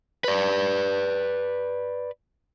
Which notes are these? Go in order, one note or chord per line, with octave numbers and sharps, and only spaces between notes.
B4 D5